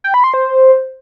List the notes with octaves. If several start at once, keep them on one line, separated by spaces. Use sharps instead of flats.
G5
B5
C6
C5